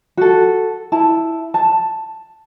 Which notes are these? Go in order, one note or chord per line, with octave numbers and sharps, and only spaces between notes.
F#4 A4
E4 A5
A5